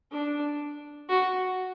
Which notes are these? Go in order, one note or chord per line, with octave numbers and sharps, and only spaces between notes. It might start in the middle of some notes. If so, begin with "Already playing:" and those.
D4
F#4